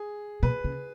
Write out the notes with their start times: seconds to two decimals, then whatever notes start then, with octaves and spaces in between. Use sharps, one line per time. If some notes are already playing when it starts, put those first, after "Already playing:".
Already playing: G#4
0.43 B2 B4
0.64 C#3